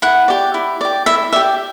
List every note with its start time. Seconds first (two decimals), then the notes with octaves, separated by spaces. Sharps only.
0.02 E4 F#5
0.28 G4 D5
0.54 E4
0.81 G4 D5
1.06 E4 E5
1.33 G4 D5 E5